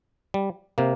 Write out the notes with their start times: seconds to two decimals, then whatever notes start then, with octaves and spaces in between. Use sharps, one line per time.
0.34 G3
0.78 C3 A#3